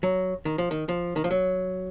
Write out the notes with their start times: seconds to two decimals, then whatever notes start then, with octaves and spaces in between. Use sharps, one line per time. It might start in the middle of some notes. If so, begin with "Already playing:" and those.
0.03 F#3
0.45 D#3
0.58 F3
0.71 D#3
0.89 F3
1.16 D#3
1.24 F3
1.31 F#3